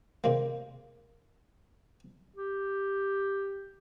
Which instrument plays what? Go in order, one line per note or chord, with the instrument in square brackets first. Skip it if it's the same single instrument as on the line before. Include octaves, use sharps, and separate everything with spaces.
[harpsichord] C3 G#3 A#3
[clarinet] G4